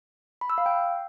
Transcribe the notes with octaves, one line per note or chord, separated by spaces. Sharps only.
B5
E6
F5
G5